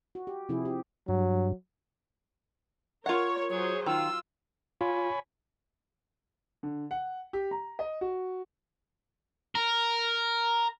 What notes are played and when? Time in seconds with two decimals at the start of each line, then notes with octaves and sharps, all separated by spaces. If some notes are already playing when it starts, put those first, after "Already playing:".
0.15 F#4
0.27 G4
0.49 C3 F3 E4 G#4
0.65 G4
1.08 G2 F#3
3.06 F4 A#4 C#5 F#5
3.49 F#3 G#4 C5 C#5
3.86 D#3 F4 E6
4.81 F4 C#5 G#5 B5
6.63 D3
6.91 F#5
7.33 G4
7.51 A#5
7.79 D#5
8.01 F#4
9.55 A#4